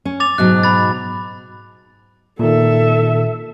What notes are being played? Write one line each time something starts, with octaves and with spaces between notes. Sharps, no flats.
C#4
D6 A6 F7
G#2 B2 F#3 F#6
B5 A6
A#2 D#3 A4 E5